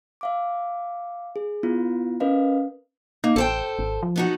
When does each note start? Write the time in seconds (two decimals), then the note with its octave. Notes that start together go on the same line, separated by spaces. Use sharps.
0.21 E5 F5 D6
1.36 G#4
1.63 B3 E4 F4
2.20 C#4 A#4 B4 D#5 F5
3.24 A#3 D#4
3.36 A1 A4 C5 G5
3.79 G#1
4.03 F3
4.16 B3 D#4 F#4